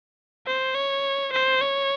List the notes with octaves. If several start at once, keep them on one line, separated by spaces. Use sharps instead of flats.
C5
C#5
C5
C#5